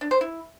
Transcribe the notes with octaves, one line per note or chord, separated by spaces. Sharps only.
D4
C5
E4